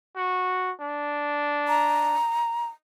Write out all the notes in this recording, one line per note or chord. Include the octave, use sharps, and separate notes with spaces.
F#4
D4
A#5